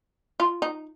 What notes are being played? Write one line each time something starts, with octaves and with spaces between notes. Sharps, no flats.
F4
D#4